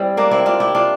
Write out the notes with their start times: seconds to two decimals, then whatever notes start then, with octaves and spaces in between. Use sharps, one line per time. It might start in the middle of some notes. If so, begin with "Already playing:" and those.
Already playing: G3 C4 E4
0.17 A#3 D4
0.31 C4 E4
0.46 D4 F4
0.60 E4 G4
0.75 D4 F4